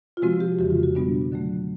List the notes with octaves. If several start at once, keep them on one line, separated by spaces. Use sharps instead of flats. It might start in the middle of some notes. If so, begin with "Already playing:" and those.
F4
C3 F3 G#3 C4 F#4
G4
F2 C#3 E3 F#4
F4
F#4
B2 G3 B3 D4
D3 F#3 A3